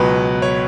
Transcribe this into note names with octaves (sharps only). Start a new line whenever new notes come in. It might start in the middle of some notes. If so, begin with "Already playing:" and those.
Already playing: C#2 B2 F#3 B4
C#5